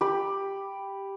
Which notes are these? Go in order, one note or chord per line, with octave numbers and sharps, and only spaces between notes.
G4 B5